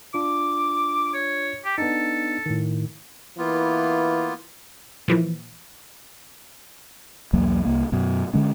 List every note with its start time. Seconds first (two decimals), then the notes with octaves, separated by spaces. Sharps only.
0.14 D4 F4 D6
1.14 C#5
1.65 G4
1.78 B3 D4 D#4 A4
2.46 A2 D#3
3.38 E3 A#3 B3 F4
5.08 A#2 E3 F3
7.33 B1 E2 F#3 A#3
7.65 C2 A#3
7.92 F#2 B2
8.34 D3 G#3 C#4